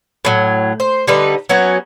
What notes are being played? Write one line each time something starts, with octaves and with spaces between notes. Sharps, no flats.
A2 F#3
C5
D3 G3 D#4 B4
F#3 B3 C#4 F#4